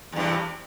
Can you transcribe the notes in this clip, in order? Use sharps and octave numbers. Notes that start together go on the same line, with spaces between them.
E2 G2 C3